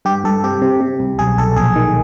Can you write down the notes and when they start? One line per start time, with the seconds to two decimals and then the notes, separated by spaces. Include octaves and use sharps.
0.05 G2 G4
0.24 G2 A4
0.44 C3 G4
0.62 C3
0.81 C3
1.00 C2
1.19 B1 G#4
1.38 B1 A4
1.56 A#1 G#4
1.76 D#3